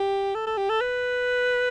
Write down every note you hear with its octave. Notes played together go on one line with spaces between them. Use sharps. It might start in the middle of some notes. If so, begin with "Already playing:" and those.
Already playing: G4
A4
A4
G4
A4
B4